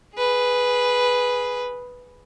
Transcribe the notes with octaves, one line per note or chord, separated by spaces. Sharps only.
G#4 B4